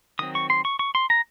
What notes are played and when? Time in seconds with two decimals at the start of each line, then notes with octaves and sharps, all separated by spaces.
0.19 D#3 F#3 C4 D#6
0.35 C#6
0.50 C6
0.65 C#6
0.79 C#6
0.95 C6
1.10 A#5